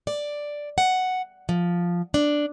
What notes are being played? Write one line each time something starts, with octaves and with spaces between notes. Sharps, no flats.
D5
F#5
F3
D4